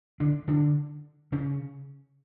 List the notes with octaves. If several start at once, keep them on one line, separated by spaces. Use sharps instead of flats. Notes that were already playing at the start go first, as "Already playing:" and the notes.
D3 D4
D3 D4
C#3 C#4